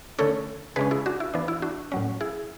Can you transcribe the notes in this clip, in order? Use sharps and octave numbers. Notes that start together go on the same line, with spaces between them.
D3 A3 C#4 A4 C#5
C#3 G#3 C#4 G#4 B4
E4 G#4
D4 F#4
E4
E3 B3 D4
E4
D4 F#4
A2 F#3 C#4
E4 G#4